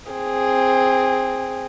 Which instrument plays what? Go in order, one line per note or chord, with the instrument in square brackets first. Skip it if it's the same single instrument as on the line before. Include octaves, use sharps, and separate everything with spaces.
[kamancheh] C4 G#4